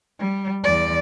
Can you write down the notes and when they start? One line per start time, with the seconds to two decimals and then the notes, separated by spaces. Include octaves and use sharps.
0.19 G3
0.64 E2 D5